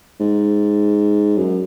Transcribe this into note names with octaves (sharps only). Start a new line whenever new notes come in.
G#2
F#2